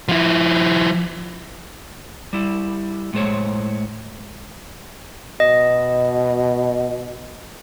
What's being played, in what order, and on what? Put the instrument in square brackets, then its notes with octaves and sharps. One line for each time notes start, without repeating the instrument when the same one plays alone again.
[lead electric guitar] F3 E4
[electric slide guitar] G3 E4
A2 G#3 C5 C#5
[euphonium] B2 [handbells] D#5